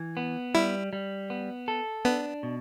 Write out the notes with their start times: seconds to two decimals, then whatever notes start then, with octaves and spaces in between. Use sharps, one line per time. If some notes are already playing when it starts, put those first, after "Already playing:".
Already playing: E3
0.17 B3
0.55 G3 E4
0.93 G3
1.30 B3
1.68 A4
2.05 B3 D4
2.43 B2